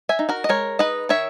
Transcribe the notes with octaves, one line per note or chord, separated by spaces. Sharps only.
E5 G#5
D#4
F#4 A#4
D#5
G#3 A#4 C#5
D#4 B4 D#5
D#3 C#5 E5